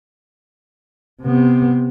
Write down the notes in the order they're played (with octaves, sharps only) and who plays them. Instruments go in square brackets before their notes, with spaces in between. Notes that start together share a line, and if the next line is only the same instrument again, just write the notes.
[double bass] C3 B3